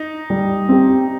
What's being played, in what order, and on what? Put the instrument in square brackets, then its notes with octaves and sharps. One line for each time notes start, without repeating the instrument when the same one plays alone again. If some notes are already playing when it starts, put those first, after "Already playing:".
Already playing: [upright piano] D#4
[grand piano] G3
C4 G4